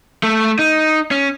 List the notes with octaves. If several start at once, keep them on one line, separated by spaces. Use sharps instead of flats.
A3
D#4
C#4